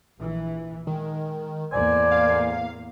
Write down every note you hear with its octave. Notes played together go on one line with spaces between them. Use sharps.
A#1 E3
D#3 G#3
E2 A2 A#3 C5 D5 G#5
F5